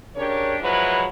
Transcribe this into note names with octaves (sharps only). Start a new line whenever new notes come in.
C#3 D4 G4 A#4 C#5
F3 F#3 G#3 E4 B4